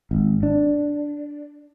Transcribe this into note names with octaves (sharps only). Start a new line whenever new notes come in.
G#1
D4